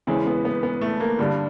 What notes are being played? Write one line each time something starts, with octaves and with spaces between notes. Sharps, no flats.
E2 C#3 E3 G#3 C4
B3
B3
B3
A3
A#3
G2 D3 G3